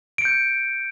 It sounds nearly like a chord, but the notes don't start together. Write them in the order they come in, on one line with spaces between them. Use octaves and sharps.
D7 C#7 G6